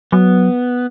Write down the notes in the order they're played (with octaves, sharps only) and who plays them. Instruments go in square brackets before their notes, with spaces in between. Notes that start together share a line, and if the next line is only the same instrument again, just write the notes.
[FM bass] F#3 [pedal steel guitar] B3